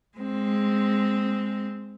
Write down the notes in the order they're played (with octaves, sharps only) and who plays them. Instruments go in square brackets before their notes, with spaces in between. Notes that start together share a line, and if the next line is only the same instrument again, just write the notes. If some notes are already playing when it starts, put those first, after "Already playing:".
[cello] G#3 C4